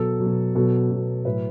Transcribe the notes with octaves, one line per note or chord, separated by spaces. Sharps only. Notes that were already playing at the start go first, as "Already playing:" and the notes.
Already playing: B2 F#3 A4
F#3
B2
B2 F#3 A4
B2 F#3
A2 F#3 B4